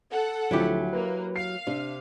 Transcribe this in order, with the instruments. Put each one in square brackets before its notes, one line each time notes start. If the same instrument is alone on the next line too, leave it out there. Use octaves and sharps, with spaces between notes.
[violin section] A4 F#5
[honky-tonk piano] D2 F3 [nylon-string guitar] F#3 E4 G4
[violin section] A#3 [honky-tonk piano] B4
[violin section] F5 [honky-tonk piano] C7
[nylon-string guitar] C3 [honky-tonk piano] D4